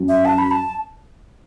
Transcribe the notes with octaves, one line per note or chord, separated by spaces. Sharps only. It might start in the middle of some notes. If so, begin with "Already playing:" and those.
Already playing: F#2
E5
A5
B5
A5